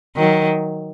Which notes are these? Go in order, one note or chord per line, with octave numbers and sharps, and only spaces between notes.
D#3 F#3